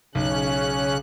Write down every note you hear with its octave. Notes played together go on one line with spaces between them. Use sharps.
B1 C#3 C#4 F#6